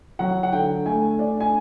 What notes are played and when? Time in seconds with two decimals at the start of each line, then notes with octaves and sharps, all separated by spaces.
0.19 F#3 F#5
0.43 F#5
0.53 D3 G5
0.85 A3 G#5
1.19 D4
1.41 G#5